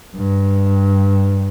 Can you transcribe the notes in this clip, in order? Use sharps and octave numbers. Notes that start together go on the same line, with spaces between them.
G2